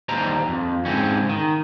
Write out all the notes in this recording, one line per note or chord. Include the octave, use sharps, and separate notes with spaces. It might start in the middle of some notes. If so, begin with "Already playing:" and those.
D#2 G3 C5 D#5 A#5
F2
G#2 C#3 C4 C#4
D#3